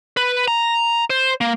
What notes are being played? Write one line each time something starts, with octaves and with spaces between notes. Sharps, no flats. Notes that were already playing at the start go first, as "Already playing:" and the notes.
B4
A#5
C5
A#3